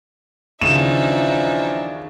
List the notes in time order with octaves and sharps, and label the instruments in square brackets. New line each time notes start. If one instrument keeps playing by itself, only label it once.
[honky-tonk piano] D#2 C#3 [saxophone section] E3 F3 D4 [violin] D#4 E5 [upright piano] E7